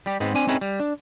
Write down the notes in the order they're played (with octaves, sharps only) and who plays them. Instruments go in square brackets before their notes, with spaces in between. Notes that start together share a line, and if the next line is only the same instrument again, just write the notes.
[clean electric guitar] G3 G4
G#2 G#3 B3 C4
C4 D4 G#5
C4 C#4 D#4 E4 G#4 B4
G3
D4